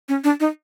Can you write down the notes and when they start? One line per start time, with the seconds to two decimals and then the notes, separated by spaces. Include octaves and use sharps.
0.09 C#4
0.24 D4
0.40 D#4